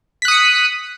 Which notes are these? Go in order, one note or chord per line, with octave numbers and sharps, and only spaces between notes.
D#6 F#6 B6 C#7